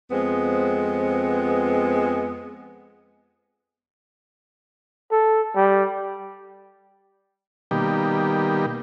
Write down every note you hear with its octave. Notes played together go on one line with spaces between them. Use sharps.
F2 G#3 B3 C4
A4
G3
B2 D#3 G3 A#3 G4